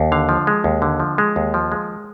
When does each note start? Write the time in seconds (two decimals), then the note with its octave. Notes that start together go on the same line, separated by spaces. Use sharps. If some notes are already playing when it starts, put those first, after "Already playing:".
Already playing: D#2
0.12 D3 F5
0.29 F3
0.47 G#3
0.64 D#2
0.82 D3
1.00 F3
1.18 G#3
1.36 D#2
1.54 F3
1.72 G#3